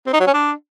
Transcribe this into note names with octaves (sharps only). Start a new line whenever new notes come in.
C4
D#4
F#3
C#4
D4